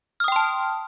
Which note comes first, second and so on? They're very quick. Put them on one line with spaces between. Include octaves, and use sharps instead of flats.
F6 D#6 G5 C6 A5